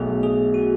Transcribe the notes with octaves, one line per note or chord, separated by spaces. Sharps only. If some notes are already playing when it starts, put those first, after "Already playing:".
Already playing: B1 B2 A3 G#4
G#4
F#4